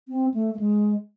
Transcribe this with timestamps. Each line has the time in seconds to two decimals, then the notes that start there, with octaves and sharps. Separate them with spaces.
0.08 C4
0.34 A3
0.54 A3
0.59 G#3